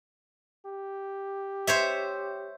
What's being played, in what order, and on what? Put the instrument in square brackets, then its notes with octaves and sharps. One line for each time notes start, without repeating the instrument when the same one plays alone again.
[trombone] G4
[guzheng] C5 C#5 E5